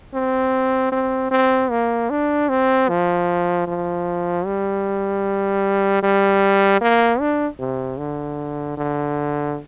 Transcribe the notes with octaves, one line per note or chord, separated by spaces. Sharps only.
C4
C4
C4
A#3
D4
C4
F3
F3
G3
G3
A#3
D4
C3
D3
D3